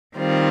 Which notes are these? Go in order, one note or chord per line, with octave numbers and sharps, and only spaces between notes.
D#3 G3 C4 F4